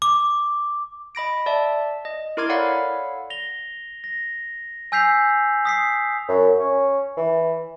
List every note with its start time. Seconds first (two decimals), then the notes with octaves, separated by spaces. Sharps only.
0.02 D6
1.15 D#5 B5 A#6 D7
1.46 D5 E5 A5
2.05 D#5
2.37 E4 A#4 C6 D6 F6 G#6
2.49 A4 C#5 D5 F5 F#5 B5
3.30 A#6 F7 G7
4.04 A#6
4.92 G#5 E6 G6 B6 C7 F7
5.65 D#6 B6 C7
6.28 F#2
6.59 C#4
7.17 E3